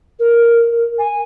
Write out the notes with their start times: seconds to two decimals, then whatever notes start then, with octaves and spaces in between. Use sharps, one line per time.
0.19 A#4
0.99 G#5